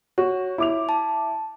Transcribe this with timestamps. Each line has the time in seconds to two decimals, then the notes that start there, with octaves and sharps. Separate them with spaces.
0.18 F#4 C#5
0.58 E4 D6 F7
0.89 A5